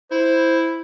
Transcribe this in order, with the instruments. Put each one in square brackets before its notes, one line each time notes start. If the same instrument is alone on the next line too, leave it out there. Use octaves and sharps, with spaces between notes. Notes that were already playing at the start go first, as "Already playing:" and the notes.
[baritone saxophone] E4 [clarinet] C5